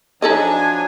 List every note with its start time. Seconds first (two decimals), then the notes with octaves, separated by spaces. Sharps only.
0.22 F3 F#3 D4 D#4 A4 D#5 G#5